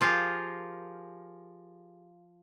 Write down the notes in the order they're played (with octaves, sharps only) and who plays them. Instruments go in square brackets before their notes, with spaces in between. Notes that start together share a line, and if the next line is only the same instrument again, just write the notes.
[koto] F3 F4 G4 G#4 A#4